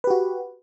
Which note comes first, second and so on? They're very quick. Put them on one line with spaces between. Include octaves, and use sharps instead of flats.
B4 G4 F#4